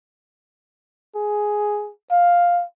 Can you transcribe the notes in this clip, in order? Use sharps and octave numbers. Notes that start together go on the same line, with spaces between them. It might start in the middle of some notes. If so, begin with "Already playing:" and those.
G#4
F5